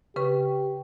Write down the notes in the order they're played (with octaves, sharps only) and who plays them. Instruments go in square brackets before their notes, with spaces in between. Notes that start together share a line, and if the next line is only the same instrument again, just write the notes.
[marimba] C#3 B4 C#6 [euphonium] G4